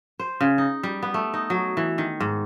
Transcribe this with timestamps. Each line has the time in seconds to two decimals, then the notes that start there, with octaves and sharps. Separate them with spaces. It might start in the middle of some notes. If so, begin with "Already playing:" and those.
0.19 C5
0.41 C#3
0.58 D#4
0.83 G3
1.03 B3
1.14 A3
1.34 D#4
1.50 F#3
1.77 E3
1.98 D#3
2.20 G#2